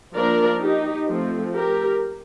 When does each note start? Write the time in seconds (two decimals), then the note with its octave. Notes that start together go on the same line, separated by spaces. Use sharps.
0.15 F3 A#3 D4 A#4 D5
0.61 D#4 G4
1.09 F3 A3 C4
1.55 G4 A#4